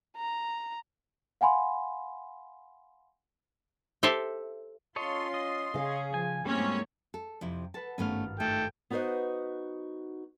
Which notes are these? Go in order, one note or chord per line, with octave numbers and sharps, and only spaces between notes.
A#5
F5 F#5 G#5 B5 C6
G4 A4 C5 E5 A5
C#4 F4 A4 C#5 D#5 C6
D#5
C#3 C#4 G#4 F5
F3 G#5
E2 G#2 G3 A3 A#3 C4 C#4 C#5
A4
F2 C3 E4
A4 B4 F#5 A5
G#1 G2 A3 B3 C#4 F5
A3 D#4 A4 G5
B3 D#4 F#4 B4 C5 D#5